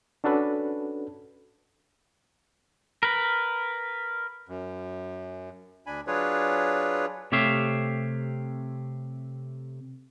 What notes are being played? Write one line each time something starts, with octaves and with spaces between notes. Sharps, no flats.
C#4 D4 F#4 A4 B4
A#4 B4
F#2
D2 D4 G#5 B5
F#3 D4 F4 G#4 B4 C#5
C3 A3 G4 C#5 E5 F5